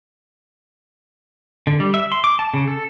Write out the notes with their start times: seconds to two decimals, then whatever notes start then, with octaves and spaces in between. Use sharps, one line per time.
1.67 D3
1.80 G3
1.94 E5
2.12 C6
2.24 D6
2.39 A5
2.54 C#3
2.67 A4